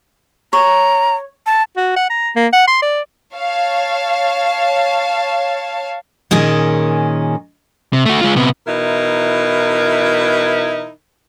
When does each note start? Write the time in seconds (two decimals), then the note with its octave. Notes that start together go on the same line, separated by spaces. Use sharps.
0.53 C#5 A#5
1.46 A5
1.77 F#4
1.96 F#5
2.10 A#5
2.35 A#3
2.53 F#5
2.68 C6
2.82 D5
3.34 C#5 F5 A5
6.31 A#2 D#3 C#4 G#4
7.93 C3
8.06 A3 F#4
8.21 G#3 F4
8.36 C3 B3
8.67 B2 E3 D#4 E4 A#4